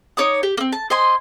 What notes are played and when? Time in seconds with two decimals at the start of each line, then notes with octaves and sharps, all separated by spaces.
0.17 D#4 C#5 D6 D#6
0.43 G4
0.57 A#3 C4
0.73 A5
0.90 C5 D#5 G#5 C6